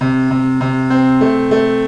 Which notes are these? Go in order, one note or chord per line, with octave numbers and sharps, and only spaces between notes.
C3
C3
C3
C4
A3
A3